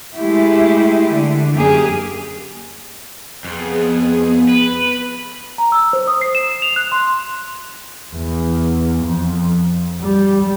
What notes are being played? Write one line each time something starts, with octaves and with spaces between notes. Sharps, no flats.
G#3 A3 E4 G4
D3
F#2 A#3 G4 G#4
F2 B3 G#4
B4
A#5
E6
C5
D#6
C7
E7
F7
F#6
C6
E2
F2
G3